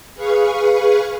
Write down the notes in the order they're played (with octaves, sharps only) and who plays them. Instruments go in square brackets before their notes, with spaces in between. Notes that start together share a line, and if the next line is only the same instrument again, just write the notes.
[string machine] G#4 B4 F5 C#6